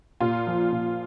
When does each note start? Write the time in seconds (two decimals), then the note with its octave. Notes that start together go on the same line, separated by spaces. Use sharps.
0.21 A#2 F4
0.47 F3
0.72 A#2